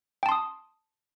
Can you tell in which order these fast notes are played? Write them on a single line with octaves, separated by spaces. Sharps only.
G5 A5 C6 D#6